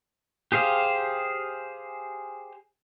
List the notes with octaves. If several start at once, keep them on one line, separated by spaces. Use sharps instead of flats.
G4 G#4 C5 F5